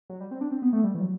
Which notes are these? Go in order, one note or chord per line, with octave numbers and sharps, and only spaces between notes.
F#3
G3
C4
D4
C4
B3
A3
G3
E3
F#3